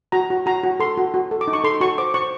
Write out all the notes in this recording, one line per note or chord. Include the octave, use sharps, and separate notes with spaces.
F#4 A#5
F#4
F#4 A#5
F#4
A4 C6
F#4
F#4
A4
D6
D#4
C#6
A4 C6
F#4 C#6
C5 D6
C5 C#6